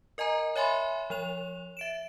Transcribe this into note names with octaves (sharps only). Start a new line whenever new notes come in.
A#4 D#5 G#5 A#5
C#5 E5 G#5 B5 C6
F3 C#5 F7
E5 D7 E7